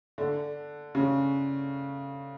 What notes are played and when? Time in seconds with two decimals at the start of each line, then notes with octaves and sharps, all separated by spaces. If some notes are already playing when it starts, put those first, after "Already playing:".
0.18 D3
0.95 C#3